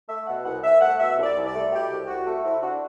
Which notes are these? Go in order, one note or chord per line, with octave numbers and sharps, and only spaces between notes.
A3 E5
B2 F#5
C2 F#5
C2 E5
A3 F#5
B2 E5
C2
D5
C2
D5
A3
B2 G4
C2
C2 F#4
A3
C3 E4
D4 F#4